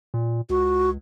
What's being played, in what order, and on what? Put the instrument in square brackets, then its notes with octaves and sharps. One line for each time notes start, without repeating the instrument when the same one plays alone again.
[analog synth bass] A#2
[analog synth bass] C#2 [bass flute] F#4